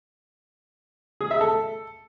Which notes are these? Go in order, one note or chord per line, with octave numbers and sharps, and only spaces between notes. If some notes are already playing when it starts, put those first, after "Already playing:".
G#4
E5
A4